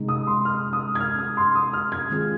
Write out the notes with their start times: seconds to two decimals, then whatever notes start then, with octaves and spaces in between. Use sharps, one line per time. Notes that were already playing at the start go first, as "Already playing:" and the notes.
Already playing: C3 G#3 D#4
0.08 D#6
0.27 C6
0.45 F6
0.73 D#6
0.95 G#6
1.00 F6
1.19 D#6
1.37 C6
1.55 D#6
1.73 F6
1.92 G#6
2.10 D#3 G#3 C4 F4 G#4